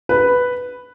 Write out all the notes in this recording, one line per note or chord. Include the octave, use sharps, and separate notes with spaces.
B4